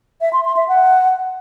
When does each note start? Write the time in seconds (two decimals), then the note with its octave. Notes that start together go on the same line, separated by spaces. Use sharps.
0.21 E5
0.33 C6
0.45 C6
0.56 E5
0.68 F#5